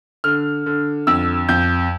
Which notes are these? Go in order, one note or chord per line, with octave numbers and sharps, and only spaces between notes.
D3 F6
D3
F2 E6
F2 G6